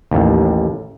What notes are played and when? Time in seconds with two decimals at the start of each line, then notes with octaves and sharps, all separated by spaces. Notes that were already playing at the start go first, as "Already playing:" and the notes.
0.11 A1 D#2